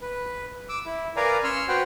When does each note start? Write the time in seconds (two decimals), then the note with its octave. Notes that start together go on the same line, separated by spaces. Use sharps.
0.01 B4
0.69 D6 E6
0.86 E4
1.17 A#4 B4 D5 F5 G#5 A#5
1.44 C#4 C#5 C6 E6 F6
1.68 F#4 B4 C5 F#5 G5